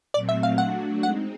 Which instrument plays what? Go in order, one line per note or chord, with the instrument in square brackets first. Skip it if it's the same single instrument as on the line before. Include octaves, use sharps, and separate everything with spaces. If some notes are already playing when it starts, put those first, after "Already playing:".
[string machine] A#2 F#3 A3 C4 [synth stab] D5
[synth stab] E5
F5
[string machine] F#3 A3 D4 F#4 [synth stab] F#5
[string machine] G#3 C4 D#4 [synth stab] F#5